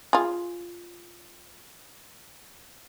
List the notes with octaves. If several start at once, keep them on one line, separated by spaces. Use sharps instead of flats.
F4 G#4